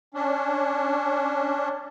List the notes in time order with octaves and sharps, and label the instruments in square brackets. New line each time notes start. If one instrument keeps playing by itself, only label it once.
[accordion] C#4 D4